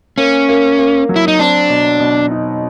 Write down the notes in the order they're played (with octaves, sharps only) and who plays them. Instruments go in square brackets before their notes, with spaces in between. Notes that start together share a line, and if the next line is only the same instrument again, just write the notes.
[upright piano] A#3 [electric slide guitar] C#4
[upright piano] A#3
A#3
F#3
[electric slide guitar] E4
D#4
[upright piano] C4 [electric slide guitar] D4
[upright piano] B2
B2
D#4